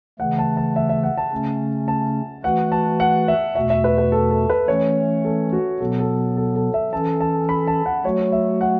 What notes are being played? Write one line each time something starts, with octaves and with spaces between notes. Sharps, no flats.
C#3 E3 A3 F#5
A5
A5
E5
E5
F#5
A5
C#3 A3 C#4
A5
E3 A3 F#4 B4 F#5
A5
F#5
E5
E2 B2 A3 F#4 E5
E5
B4
B4
A4
A4
B4
E3 A3 C#4 C#5
A4
F#4
B2 F#3 B3 A4
A4
A4
A4
E5
E3 C#4 A4 A5
A5
B5
A5
F#5
F#3 A3 F#4 C#5
E5
F#5